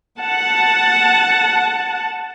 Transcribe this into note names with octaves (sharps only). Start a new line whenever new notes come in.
F#5 A5